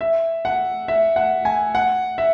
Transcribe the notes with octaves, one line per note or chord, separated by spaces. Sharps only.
E5
F#5
E5
F#5
G#5
F#5
E5